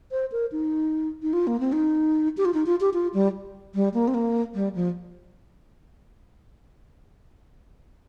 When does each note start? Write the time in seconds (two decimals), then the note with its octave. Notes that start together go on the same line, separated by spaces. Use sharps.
0.12 C5
0.32 A#4
0.52 D#4
1.22 D#4
1.33 F4
1.47 A#3
1.60 C4
1.72 D#4
2.37 G4
2.45 F4
2.54 D#4
2.66 F4
2.80 G4
2.94 F4
3.14 G3
3.75 G3
3.94 A#3
4.08 C4
4.14 A#3
4.55 G3
4.75 F3